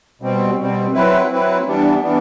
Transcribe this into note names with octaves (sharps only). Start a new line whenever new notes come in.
B2 G3 C4
B2 G3 C4
F#3 C4 E4 B4
F#3 C4 E4 B4
E3 G3 B3 D4
E3 G3 B3 D4